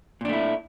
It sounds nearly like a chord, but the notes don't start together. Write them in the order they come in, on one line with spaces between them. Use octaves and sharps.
A#2 D4 A3 E4